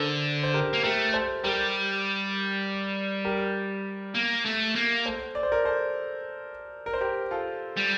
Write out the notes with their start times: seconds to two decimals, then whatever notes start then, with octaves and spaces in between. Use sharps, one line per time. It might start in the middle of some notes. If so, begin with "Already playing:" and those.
Already playing: D3 A4 A#4 C5
0.43 C5
0.54 G4 A#4
0.73 A#3
0.83 A3 G4 A#4
1.14 A4 C5
1.44 G3 G4 A#4
3.25 G4 A#4
4.15 A#3
4.46 A3
4.76 A#3
5.06 A4 C5
5.35 D5
5.43 C5
5.52 A#4 D5
5.65 A4 C5
6.86 A#4
6.93 C5
7.01 G4 A#4
7.31 F4 A4
7.77 G3